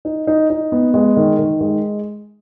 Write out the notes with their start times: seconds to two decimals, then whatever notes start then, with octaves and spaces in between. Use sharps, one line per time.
0.05 D#4
0.27 D#4
0.50 D#4
0.72 B3
0.94 G#3
1.16 D#3
1.39 D#3
1.61 G#3